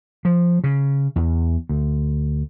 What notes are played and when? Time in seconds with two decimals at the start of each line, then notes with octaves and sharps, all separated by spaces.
0.25 F3
0.64 C#3
1.16 E2
1.69 D2